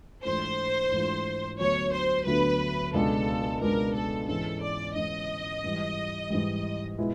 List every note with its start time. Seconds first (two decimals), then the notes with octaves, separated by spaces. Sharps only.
0.25 G#2 E3 A3 D4 F4 C5
0.92 G#2 E3 A3 D4 F4
1.59 D2 D3 F#3 B3 C#5
1.93 C5
2.26 D2 D3 F#3 B3 B4
2.94 C#2 B2 G#3 B3 D4 A4
3.61 C#2 B2 G#3 B3 D4 A#4
3.95 A4
4.29 G#2 E3 G#3 C#4 A4
4.63 D5
4.96 G#2 E3 G#3 C#4 D#5
5.64 G#2 E3 G3
6.30 G#2 E3 G3
6.98 B2 G#3 B3 E4